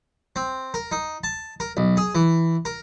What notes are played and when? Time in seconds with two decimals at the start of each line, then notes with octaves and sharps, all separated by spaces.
0.36 C4
0.74 A#4
0.92 D#4
1.24 A5
1.60 A#4
1.77 B1
1.97 G#4
2.15 E3
2.65 A#4